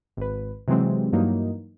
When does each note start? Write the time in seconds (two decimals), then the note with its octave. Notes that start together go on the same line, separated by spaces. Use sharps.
0.17 G#1 B4
0.68 C3 E3 F#3 G#3 C4
1.13 G2 E3 F#3 A#3 D#4